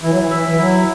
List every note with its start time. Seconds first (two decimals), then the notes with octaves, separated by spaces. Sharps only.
0.03 E3 E4
0.11 F#3
0.19 E3
0.31 E3 E5
0.48 E3
0.58 F#3 E4